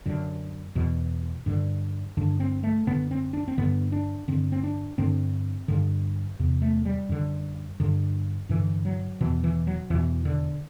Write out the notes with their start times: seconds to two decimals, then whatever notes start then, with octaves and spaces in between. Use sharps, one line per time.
0.06 F#2 D3
0.75 E2 B2
1.46 G2 D3
2.17 G2 D3 D4
2.40 C4
2.63 A3
2.87 F#2 D3 B3
3.11 C4
3.33 D4
3.48 C4
3.58 G2 D3 B3
3.92 D4
4.28 G2 D3 C4
4.52 C4
4.63 D4
4.98 G2 D3 C4
5.68 G2 D3
6.39 E2 C3
6.62 A3
6.85 G3
7.09 F#2 D3
7.80 G2 D3
8.49 G2 D3 E3
8.85 F#3
9.21 E2 B2 E3
9.44 E3
9.67 F#3
9.90 E2 B2 E3
10.25 D3